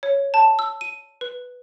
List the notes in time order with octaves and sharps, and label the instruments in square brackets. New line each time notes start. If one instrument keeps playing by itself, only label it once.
[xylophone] C#5
A5
E6
D#7
B4